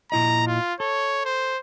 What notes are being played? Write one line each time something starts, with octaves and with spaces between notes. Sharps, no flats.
A#2 E4 D#5 A#5
F4
A4 C#5
C5